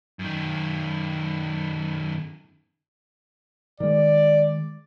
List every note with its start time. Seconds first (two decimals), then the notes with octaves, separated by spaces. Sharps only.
0.19 F#2 D#3
3.80 D#3 G#3 D5